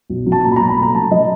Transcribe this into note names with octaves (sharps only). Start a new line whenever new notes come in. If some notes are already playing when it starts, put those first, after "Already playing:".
B1
F#3
A5
A#2 A#5
B5
A#5
B1
B5
A3
A#5
F#3 A5
F#3 D#5